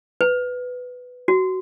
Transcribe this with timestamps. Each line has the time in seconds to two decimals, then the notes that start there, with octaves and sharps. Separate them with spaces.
0.21 B4
1.28 F#4